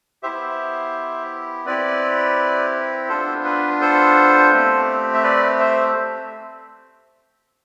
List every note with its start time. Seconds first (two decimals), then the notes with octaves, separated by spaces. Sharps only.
0.23 B3 E4 G4 C5 E5
1.66 C4 E4 G4 B4 D5
3.09 B3 D4 F4 A4 C5
3.45 B4
3.81 A4 C5
4.52 A3 C4 G4
5.14 E5
5.23 B4 D5
5.59 C5 E5